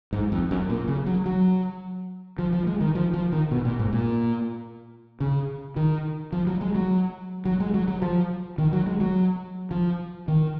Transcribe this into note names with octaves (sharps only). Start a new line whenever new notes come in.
G#2
F2
F#2
A#2
C#3
F#3
F#3
F3
F3
G#3
D#3
F3
F3
D#3
B2
A#2
G#2
A#2
C#3
D#3
F3
F#3
G#3
F#3
F#3
G#3
F#3
F#3
F3
D#3
F#3
G#3
F#3
F3
D#3